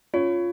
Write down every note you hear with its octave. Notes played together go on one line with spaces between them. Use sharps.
C#4 F4 C#5